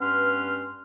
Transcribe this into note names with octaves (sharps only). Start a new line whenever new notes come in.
G2 B3 C#4 B4 C6 F6